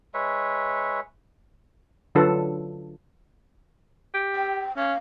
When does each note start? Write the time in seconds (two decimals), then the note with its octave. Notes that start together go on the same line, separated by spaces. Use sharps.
0.14 G#3 B4 C#5 E5
2.15 D3 F#3 D4 F4 A4 B4
4.14 G4
4.35 G5
4.77 C#4 F5